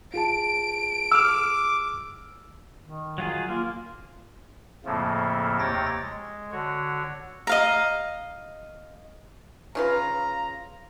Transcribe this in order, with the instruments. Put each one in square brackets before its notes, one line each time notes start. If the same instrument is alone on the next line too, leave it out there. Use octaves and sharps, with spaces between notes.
[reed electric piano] F4 G#4 A5 [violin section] D7
[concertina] D6 [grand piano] E6 F6
[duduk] D#3
[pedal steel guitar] F#3 F4 G#4
[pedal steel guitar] A#3 [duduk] F4
[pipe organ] F2 A2 C#3 F3 A3 A#3
D#2 C3 C#5 G5 A6 A#6
G#3
D3 F#4 C#5
[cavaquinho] D#5 F5 A#5
[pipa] C#3 F4 B4 [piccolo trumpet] A#5